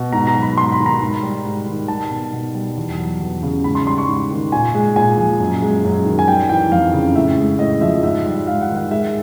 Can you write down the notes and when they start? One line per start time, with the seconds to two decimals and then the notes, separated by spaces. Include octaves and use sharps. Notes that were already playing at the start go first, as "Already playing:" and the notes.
Already playing: B2
0.13 G#2 A#5
0.27 A#5
0.35 F#3
0.42 B5
0.57 G#2 C6
0.72 B5
0.79 D#3
0.86 A#5
1.00 G#2 B5
1.23 G3
1.45 G#2
1.66 D#3
1.88 G3 A5
2.11 B2
2.33 B2
2.55 G3
2.77 E2
2.98 F#3
3.20 E2
3.43 C#3
3.64 G#2 B5
3.75 C6
3.86 G3 C6
3.98 C#6
4.08 G#2
4.31 D#3
4.52 A#2 G#5
4.74 G#3
4.96 A#2 G#5
5.17 F3
5.40 F#2
5.62 G#3
5.84 F#2
6.06 D#3
6.19 G#5
6.27 G3 G5
6.49 E3 G5
6.72 F2 F5
6.93 C#3
7.16 A2 E5
7.37 G#3
7.59 A2 D#5
7.81 F3 E5
8.03 G#2 E5
8.26 G3
8.47 G#2 F5
8.61 F#5
8.69 D#3
8.76 F#5
8.91 G#3 E5